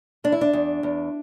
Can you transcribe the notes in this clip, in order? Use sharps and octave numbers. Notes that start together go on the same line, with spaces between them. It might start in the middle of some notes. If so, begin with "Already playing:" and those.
E2 D4
E4
D4
E2
E2